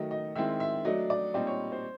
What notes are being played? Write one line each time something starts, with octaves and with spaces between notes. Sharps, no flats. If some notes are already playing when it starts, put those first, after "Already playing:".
Already playing: D#3 F#3 A3 D#5
D#5
D#3 G#3 C4 E4 E5
E5
F#3 A3 D4 D#5
D5
A#2 G3 C4 D#4 D5
C#5
C5